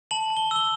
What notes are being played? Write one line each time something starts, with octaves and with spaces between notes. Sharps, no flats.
A5 F#7
A5
G7
E6 G7